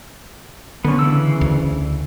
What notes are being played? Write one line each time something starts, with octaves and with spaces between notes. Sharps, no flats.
D3 B3 C#4
C#3 E3 E6
D2